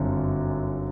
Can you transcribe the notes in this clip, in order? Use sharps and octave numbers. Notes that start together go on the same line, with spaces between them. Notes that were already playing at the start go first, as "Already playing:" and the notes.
Already playing: G1 F#2 D3 C4